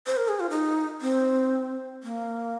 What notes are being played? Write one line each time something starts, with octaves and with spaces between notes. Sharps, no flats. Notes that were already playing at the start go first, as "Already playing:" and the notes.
C5
A#4
G#4
F4
D#4
C4
A#3